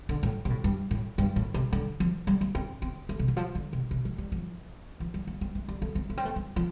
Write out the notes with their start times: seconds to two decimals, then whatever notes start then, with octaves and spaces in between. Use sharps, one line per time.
0.09 D3
0.23 A2
0.45 C3
0.50 A2
0.64 G2
0.91 A2
1.18 G2
1.36 A2
1.54 C3
1.73 D3
2.00 F3
2.27 G3
2.41 A3
2.55 C4
2.82 C4
3.09 A3
3.19 C3
3.28 D3
3.37 F3
3.55 D3
3.73 C3
3.91 C3
4.05 F3
4.18 G3
4.32 F3
5.00 F3
5.14 G3
5.27 A3
5.41 C4
5.55 A3
5.68 G3
5.82 A3
5.95 C4
6.10 A3
6.17 C4
6.25 A3
6.36 C4
6.56 F3